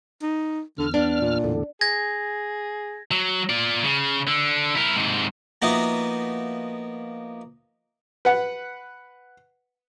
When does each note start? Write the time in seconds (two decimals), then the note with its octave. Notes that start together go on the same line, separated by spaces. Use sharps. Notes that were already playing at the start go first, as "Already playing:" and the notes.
0.22 D#4
0.78 E2 D3 F6
0.94 B3 D4
1.21 A#2
1.44 E2 A2 D3
1.81 G#4 G#6 A#6
3.11 F#3
3.50 F4 D5
3.83 C#3
4.27 D3
4.75 E4 A#4
4.96 G#2 C3
5.62 F3 A#3 B3 D#4 F#4 E5
8.25 B4 F#5